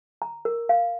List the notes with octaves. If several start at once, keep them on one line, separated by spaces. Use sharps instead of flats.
A#5
A#4
F5